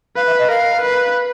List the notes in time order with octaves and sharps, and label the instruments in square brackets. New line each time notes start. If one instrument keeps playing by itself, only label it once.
[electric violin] B4 [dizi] F5
[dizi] E5
D#5
[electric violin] A#4 [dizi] F5
[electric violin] B4